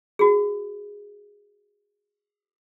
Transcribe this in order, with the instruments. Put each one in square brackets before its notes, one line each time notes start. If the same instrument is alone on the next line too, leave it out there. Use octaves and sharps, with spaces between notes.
[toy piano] F#4 G#4